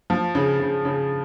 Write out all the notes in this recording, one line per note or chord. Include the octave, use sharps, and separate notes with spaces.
F3
C#3
C#3
C#3